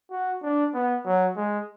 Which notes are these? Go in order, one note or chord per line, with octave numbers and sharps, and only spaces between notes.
F#4
D4
B3
F#3
G#3